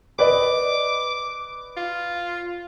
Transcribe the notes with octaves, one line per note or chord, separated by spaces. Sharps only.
B4 D5 D#5 D6
F4